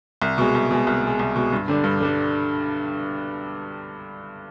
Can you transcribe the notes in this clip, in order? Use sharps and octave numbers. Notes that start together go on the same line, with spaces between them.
C2
B2 G#3
C2
B2 G#3
C2
B2 G#3
C2
B2 G#3
G2
D3 G3 D4
G2
D3 G3 D4